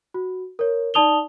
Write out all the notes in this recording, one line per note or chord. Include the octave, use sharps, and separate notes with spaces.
F#4
A#4 C#5
D#4 D5 A5 D#6 F7 G7